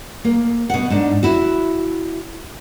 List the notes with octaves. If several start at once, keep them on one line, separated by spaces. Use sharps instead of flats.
A#3
B2 F#5
G#2 D4
E4 F#4